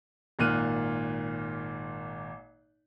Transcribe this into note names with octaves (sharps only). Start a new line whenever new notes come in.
G#1 A#2 F6 F#6 D#7